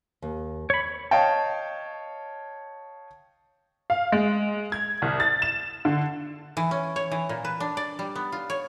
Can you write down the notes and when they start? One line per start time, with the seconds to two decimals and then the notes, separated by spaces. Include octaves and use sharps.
0.22 D#2
0.70 C#5 B5
1.11 C#5 D#5 F5 G5 A5
3.90 F5
4.12 G#3
4.72 G#6
5.02 C2
5.20 A6
5.42 E7
5.85 D3
6.57 E3
6.71 C#4
6.96 C#5
7.12 E3
7.29 A#2
7.45 B4
7.60 D4
7.77 D5
7.99 G3
8.15 B3
8.32 F4
8.50 C#5